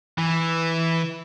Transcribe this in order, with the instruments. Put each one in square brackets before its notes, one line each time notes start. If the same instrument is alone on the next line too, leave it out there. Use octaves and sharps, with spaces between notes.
[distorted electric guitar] E3